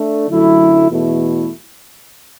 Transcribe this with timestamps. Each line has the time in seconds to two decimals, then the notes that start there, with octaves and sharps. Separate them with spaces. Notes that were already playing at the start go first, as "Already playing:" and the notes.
Already playing: A3 D4
0.29 F#2 D3 F#3 A3 E4
0.89 E2 B2 A3 E4